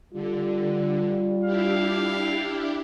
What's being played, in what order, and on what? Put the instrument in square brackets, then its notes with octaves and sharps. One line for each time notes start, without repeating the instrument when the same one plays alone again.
[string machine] D3 [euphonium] G3 [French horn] F4
[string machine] D4 E4 G4 [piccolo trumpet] F5